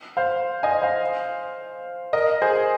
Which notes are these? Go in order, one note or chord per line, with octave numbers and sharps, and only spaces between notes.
C5 F5
D#5 G#5
C5 F5
A#4 D#5
G#4 C5